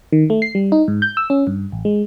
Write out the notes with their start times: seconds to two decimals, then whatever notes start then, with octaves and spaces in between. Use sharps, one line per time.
0.12 D#3
0.30 A3
0.42 C7
0.55 G3
0.72 D#4
0.88 G#2
1.02 G6
1.17 E6
1.30 C#4
1.47 G2
1.72 A1
1.85 G#3